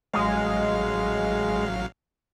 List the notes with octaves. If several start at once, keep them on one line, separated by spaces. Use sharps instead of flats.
A1 F#3 G#3 F5